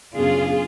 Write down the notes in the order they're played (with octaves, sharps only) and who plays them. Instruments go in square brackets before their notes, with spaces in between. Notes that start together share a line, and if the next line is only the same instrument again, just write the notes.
[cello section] F#2 C#3 F#3 B3 D4 F4 G#4